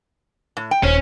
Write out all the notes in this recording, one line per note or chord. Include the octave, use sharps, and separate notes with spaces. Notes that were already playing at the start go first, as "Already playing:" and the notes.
A2
G5
D#1 C#4 C5